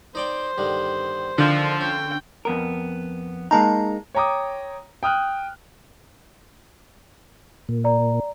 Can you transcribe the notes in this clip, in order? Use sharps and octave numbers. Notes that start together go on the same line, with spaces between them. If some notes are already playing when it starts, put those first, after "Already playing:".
D#4 C5 D5 G5
G2 D3 D#3
D3 D#3 F3 D4
C#4 G5
F2 B3 A#4
G#3 A#3 D#4 A5 A#5
C#5 G5 A#5 D6 D#6
G5 D#6 F6 F#6
A#2
D5 A#5